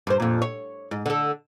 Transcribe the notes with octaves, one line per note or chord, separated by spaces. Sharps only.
G2 C5
F2 A#2
C#5
G#2
D3 A4